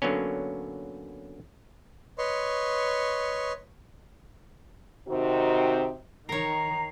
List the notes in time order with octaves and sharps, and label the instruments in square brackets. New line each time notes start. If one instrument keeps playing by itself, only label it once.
[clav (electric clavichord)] D3 F#3 A#3 B3 C#4
[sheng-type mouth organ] B4 C#5 D#5 C6 C#6
[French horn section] C3 D#3 C4 D#4 F#4
[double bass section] D#3 [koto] A#4 C#5 [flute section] A#5 [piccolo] C7